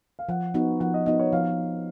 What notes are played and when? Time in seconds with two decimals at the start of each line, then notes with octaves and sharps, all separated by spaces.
0.19 F5
0.29 F3 F#5
0.54 B3 D#4 F#4
0.80 F3 F#5
0.94 D#5
1.06 B3 D#4 F#4 D#5
1.19 C#5
1.33 F3 F5